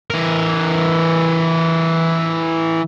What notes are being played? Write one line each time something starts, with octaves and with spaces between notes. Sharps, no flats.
E3 A#4